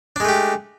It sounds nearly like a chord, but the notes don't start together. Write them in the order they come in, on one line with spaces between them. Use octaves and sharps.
D4 G#3 A3 G4